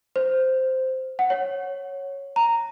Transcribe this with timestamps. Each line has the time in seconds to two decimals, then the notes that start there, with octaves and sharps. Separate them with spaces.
0.16 C5
1.19 F#5
1.30 C#5
2.36 A#5